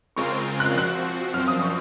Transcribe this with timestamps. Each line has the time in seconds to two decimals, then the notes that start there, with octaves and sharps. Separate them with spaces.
0.16 C#3 G#3 C4 F4 A#4 C#6
0.60 F#6
0.75 F3 C4 F#4 F#6
1.33 F#2 F3 C4 F6
1.48 D#6
1.62 C#6